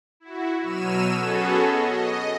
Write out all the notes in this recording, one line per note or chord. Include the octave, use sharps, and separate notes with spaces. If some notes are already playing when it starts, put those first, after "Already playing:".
E4 F#4
B2 F#3 E6 F6 D#7 E7
B3 C#4 F#4 G#4 A4
D#5